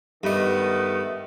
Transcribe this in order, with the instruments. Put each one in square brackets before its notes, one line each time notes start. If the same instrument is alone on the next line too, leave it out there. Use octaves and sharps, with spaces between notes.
[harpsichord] G2 D#5 [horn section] D#3 A3 B3